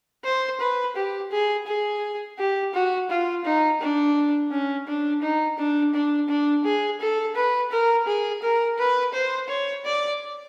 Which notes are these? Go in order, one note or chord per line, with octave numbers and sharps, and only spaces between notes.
C5
B4
G4
G#4
G#4
G4
F#4
F4
D#4
D4
C#4
D4
D#4
D4
D4
D4
G#4
A4
B4
A#4
G#4
A#4
B4
C5
C#5
D5